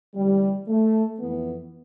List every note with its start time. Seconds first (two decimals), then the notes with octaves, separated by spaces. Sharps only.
0.15 D2 C3 E3 G3
0.68 A3
1.20 F2 E3 B3